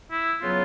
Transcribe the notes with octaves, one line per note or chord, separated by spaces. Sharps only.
E4
C#3 F#3 B3 F4